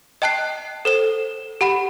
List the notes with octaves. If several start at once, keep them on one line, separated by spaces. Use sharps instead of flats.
D#5 G5 A5 F#6 C7
A4 C5 E7
G4 F#5 B5